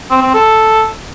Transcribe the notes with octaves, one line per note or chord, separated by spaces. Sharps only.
C4
C4
A4